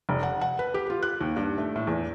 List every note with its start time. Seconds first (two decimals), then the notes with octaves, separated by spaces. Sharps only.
0.09 F1
0.23 F#5
0.41 F#5
0.59 B4
0.74 G4
0.90 F4
1.03 F#6
1.21 D#2
1.37 G2
1.58 A3
1.76 A2
1.87 E2